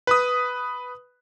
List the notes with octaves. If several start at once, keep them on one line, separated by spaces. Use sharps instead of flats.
B4 B5 D#6